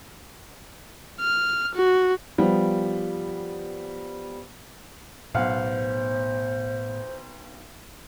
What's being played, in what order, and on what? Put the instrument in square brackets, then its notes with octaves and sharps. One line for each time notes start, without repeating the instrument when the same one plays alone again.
[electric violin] F6
F#4
[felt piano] F3 G3 B3
[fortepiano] B1 F5 F#5 [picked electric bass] A2 B3 [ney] C5